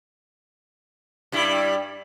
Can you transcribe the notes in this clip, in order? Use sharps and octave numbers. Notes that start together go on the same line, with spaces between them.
G2 G3 E4